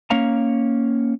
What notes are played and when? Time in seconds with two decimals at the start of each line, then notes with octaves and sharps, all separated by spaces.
0.10 A#3 C#4 C#5 F5 A#5